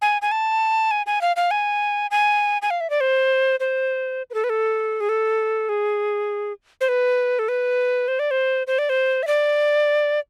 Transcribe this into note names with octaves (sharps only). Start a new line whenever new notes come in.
G#5
G#5
A5
G#5
G#5
F5
F5
G#5
G#5
G#5
F5
E5
D5
C5
C5
B4
A4
B4
A4
G#4
A4
G#4
C5
B4
A4
B4
C5
D5
C5
C5
D5
C5
E5
D5